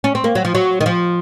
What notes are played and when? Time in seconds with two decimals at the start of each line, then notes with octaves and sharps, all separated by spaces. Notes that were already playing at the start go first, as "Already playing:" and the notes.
0.04 C#4
0.15 C4
0.24 A#3
0.35 F#3
0.45 F3
0.55 F#3
0.81 D#3
0.86 F3